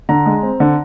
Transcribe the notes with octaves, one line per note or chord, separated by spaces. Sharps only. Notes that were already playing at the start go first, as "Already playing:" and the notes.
D3 A#5
G#3
C4
D3